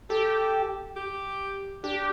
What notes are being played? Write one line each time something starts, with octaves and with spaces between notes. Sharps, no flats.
G4 A4
G4
D4 G4